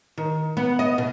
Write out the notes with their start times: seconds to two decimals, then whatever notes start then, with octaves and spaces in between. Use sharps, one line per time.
0.18 D#3
0.57 B3
0.79 D#5
0.98 B2